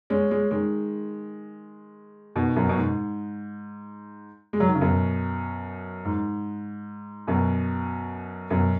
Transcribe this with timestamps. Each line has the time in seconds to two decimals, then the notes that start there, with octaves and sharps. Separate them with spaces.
0.10 G#3 C#4
0.31 G#3 C#4
0.51 D#3 G#3
2.36 B2 D#3
2.56 F#2 B2
2.69 B2
2.77 G#2
4.53 G#3
4.60 F#3
4.67 D#3
4.75 C#3
4.81 F#2 B2
6.05 G#2
7.27 F#2 B2
8.50 F#2 B2